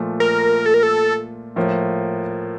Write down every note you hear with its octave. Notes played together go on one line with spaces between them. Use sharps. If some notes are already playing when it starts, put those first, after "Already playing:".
Already playing: A#2 F3 A3
A#4
A4
A#4
A4
A2 F3 A#3